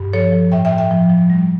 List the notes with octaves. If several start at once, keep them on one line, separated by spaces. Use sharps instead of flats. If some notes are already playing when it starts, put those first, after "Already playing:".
Already playing: G2
F3 A4 C#5
F3
A2 E5 G5
E5 G5
A2
E5 G5
F3
F3
G3